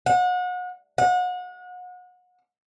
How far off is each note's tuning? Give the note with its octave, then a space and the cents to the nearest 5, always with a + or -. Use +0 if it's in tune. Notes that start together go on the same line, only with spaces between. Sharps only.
F#5 -35
F#5 -35